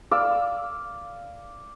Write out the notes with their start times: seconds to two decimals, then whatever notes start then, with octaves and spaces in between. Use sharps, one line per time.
0.11 D5 F5 D6 E6